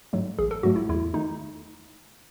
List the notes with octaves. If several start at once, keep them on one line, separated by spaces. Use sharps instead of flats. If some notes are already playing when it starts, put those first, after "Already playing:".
G#2 F#3 A3
A1 G#4
A4
G#2 F#3 A3 F#4
E4
E2 E4
D#3 A3 D#4